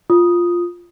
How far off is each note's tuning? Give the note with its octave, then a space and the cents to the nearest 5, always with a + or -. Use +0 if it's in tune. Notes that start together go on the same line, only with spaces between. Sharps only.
F4 +0 D#6 +0